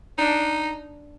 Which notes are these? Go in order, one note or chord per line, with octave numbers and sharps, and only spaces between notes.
D4 D#4